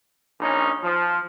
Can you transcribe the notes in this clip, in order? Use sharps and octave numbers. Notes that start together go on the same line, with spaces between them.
A#1 C#4 D#4
F3